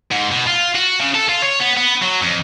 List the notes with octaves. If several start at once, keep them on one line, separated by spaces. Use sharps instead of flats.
G#2
B2
F4
F#4
C#3
A4
F4
C#5
B3
B3
F#3
F2